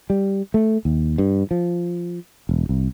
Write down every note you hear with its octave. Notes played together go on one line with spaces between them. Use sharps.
G3
A3
D#2
G2
F3
E1
C2